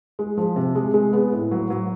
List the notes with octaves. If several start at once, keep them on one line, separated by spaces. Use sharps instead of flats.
G#3
F3
C3
G#3
G#3
B3
A2
F#3
F#3